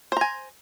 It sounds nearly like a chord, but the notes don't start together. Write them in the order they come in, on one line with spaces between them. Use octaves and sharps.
C5 A#5 G#5